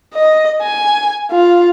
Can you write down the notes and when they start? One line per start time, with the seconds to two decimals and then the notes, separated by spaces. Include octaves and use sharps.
0.14 D#5
0.62 G#5
1.31 F4